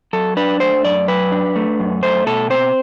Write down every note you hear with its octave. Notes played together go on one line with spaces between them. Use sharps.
F#3 A4
D4 B4
A3 C5
F#2 D5
F#3 B4
D4
A3
F#2
A3 C5
B2 A4
C4 C5